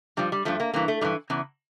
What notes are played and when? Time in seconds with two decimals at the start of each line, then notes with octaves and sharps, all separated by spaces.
0.17 G2 F3 G3
0.32 G3
0.45 G2 F3 A3
0.60 A#3
0.73 G2 E3 A#3
0.88 A3
1.01 G2 E3 G3
1.30 E2 C#3 E3